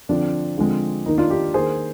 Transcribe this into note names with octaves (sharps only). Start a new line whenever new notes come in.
D3 F3 C4 D4
D3 F3 G#3 C4
D#3 A#3 D#4
D4 F4
D#4 G4
D#3 A#3 G#4 C5